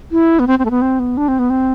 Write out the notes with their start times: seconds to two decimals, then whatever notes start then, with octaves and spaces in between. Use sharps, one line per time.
0.12 E4
0.39 B3
0.47 C4
0.59 C4
0.65 A3
0.71 B3
0.82 C4
0.99 B3
1.17 D4
1.28 C4
1.39 B3
1.50 C4